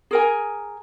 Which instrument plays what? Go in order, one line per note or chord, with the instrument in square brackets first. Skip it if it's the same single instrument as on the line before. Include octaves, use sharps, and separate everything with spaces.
[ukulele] G#4 A#4 G#5